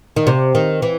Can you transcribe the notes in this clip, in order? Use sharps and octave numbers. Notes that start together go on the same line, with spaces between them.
D#3
C3
D#3
E3